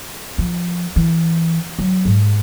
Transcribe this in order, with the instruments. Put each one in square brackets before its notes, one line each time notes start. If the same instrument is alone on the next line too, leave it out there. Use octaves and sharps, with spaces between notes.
[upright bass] F3
E3
F#3
G#2